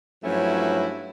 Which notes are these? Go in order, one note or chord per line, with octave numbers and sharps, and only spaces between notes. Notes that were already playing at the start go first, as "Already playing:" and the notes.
G2 F3 F#3 A3 C#4 E4